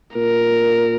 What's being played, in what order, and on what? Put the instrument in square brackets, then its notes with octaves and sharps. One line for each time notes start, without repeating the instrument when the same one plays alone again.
[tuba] A#2 [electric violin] A#4